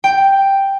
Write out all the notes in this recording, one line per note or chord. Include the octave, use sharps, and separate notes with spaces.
G5